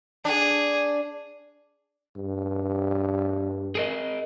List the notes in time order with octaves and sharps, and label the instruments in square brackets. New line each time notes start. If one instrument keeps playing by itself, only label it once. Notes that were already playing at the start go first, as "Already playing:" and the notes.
[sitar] D4 [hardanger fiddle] G#4
[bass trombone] G2
[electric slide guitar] G#4 A#4 D#5